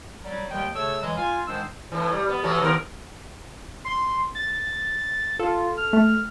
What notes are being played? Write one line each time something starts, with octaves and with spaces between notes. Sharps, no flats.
F#3 G3
D#2 D#3 G3 G#3 D#5 G5
C#3 A3 A4 C#5 E6
E3 F#3 G#3
F4 F5 G#5
G#2 D#3 G#3 D4 C5 E6
A2 E3
G3
B3
E3 F#3 A3
D#3 B3 A#4
C6
A6
F4 A4
F6
A3